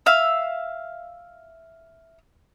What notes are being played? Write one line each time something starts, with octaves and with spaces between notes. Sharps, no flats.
E5 F5 E6